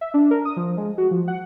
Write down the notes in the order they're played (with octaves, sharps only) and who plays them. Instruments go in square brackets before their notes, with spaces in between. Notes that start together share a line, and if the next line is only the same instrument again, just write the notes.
[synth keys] E5
D4
A#4
D#6
F3
G#3
F#4
F3
F#5